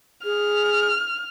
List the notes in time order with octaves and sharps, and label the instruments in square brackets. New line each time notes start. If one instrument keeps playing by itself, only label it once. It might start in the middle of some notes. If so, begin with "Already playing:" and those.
[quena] G#4 [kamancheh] F6